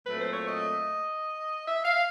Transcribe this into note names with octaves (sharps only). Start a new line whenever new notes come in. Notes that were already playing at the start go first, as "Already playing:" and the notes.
A#2 F#3 A3 C4 B4
C5
C#5
D#5
E5
F5